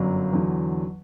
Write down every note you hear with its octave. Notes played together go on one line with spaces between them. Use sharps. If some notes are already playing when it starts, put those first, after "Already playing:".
Already playing: G1 F#2 F#3
E2 D3 F#3